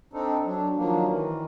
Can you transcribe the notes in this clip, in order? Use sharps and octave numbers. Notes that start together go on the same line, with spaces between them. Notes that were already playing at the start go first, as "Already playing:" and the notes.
C4 D4 D#4 A4
F#3 D4
D#3 F3 F#3 A#3 D4
D#3 E3